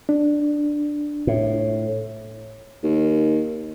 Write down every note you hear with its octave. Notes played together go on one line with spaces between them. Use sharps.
D4
A2
D#2